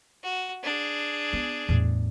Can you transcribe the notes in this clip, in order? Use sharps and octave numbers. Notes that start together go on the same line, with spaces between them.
F#4
D4 G#4
B3
E2 A2